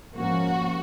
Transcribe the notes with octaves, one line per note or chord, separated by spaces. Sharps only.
G#2 F3 A#3 C#4 F#4